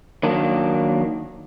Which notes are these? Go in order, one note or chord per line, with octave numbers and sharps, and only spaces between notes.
D#3 F#3 A#3 D4